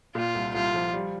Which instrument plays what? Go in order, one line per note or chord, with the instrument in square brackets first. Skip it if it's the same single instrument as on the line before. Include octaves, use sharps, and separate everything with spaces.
[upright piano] A#2 [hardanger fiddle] F4
[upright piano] C2
[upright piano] C2 [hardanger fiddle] F4
[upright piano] F3
G3